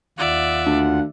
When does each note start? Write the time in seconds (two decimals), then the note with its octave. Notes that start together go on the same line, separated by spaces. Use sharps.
0.18 D#2 F4 D5 E5 F#5
0.66 D2